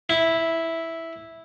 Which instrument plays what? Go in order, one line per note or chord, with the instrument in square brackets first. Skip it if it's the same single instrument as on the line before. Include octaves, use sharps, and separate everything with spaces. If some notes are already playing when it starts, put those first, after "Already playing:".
[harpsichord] E4